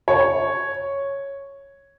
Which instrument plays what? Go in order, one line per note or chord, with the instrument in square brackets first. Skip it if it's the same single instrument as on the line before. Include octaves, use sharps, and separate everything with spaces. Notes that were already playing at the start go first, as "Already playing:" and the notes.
[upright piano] C#5